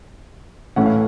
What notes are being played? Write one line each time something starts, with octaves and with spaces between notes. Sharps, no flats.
A2 E3 A3 C#4 E4 F#5
F5